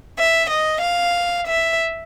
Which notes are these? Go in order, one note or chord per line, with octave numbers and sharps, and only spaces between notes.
E5
D#5
F5
E5